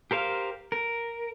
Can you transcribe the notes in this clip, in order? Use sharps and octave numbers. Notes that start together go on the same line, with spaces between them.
G4 A#4 C5 F5
A#4